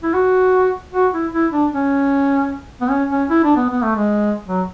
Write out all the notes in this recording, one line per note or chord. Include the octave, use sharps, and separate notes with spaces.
E4
F#4
F#4
E4
E4
D4
C#4
B3
C#4
C#4
E4
D4
B3
B3
A3
G#3
F#3